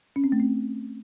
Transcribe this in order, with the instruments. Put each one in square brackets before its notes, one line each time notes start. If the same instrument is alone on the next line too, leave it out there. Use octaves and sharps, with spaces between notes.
[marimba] C#4
C4
A3
C4